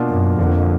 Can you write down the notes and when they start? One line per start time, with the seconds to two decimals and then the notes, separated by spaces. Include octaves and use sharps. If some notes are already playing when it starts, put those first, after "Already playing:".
Already playing: B2 A#3 D4 F4
0.10 F#2
0.39 F2 D3 F3 A#3